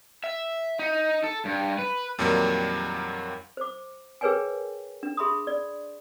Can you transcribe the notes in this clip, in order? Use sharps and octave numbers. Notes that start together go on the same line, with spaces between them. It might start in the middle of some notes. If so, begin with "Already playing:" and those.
E5
D#4
A4
G2
B4
F2 A#2 D#3 F#3 G3 A#3
C5 D6
G#4 A#4 B4 C#5 G5 G#5
D4
G#4 E5 B5 C6 D#6
D5